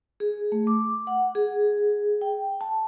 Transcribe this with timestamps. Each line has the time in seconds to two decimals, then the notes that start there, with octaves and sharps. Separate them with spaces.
0.20 G#4
0.52 A3
0.67 D6
1.07 F#5
1.35 G#4
2.21 G5
2.61 A5